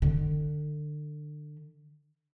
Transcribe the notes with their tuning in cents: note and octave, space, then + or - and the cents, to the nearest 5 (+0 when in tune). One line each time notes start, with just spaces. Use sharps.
D3 +30